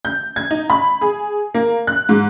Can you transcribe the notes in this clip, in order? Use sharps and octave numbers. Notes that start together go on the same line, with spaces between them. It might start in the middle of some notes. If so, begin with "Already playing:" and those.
G6
G#6
D#4
B5
G#4
A#3
F#6
G#2